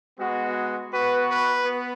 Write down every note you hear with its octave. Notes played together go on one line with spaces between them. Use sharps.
G#3 B3 F#4
B3 F#4 B4
B4
B3